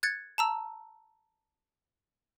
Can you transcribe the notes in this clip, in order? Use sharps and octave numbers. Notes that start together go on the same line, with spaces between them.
F#6 G#6 A6 C#7
A5 A#5 E6